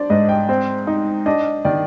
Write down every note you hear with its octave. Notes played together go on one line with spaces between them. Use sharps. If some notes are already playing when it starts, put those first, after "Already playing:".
Already playing: D4 C5 D5
G#2 D#5
G5
C4
D#4
D4 D#5
D#3 D5